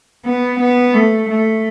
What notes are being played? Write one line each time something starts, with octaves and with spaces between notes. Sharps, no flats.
B3
B3
A3
A3